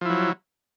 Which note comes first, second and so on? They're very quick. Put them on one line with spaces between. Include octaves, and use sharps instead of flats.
F3 E4 F#3